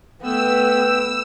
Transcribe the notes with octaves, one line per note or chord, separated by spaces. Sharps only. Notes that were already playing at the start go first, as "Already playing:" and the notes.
A3 B3 B4 G5 E6